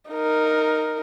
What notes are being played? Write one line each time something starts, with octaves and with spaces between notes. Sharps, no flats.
D#4 A#4